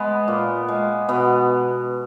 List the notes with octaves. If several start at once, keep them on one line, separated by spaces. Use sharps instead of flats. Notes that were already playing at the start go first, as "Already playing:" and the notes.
Already playing: G#3 B3
A#2
G#3
B2 B3